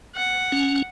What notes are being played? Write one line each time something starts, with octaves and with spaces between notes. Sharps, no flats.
F#5
C#4